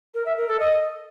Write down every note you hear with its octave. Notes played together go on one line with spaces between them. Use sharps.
A#4
E5
A#4
A4
D#5